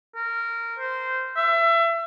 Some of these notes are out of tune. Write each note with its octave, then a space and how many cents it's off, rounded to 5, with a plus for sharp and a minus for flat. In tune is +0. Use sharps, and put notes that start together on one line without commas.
A#4 -15
C5 -15
E5 +25